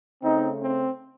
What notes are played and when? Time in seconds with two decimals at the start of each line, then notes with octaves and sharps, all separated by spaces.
0.23 C#3 A3 C4 D#4
0.62 C4